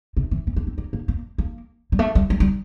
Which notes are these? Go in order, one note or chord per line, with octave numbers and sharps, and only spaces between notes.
C3
E3
E3
A#3
C4
A#3
A#3
A#3
A#3
G3
A3
G3
G3
G3